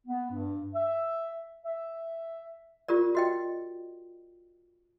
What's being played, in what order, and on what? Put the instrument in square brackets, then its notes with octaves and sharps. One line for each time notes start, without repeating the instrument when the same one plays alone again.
[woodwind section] B3
G2
E5
E5
[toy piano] F4 G4 A#4 D5
F#4 D#5 G5